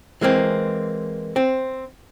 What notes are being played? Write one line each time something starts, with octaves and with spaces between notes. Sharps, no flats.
E3 G#3 A#3 C4
C4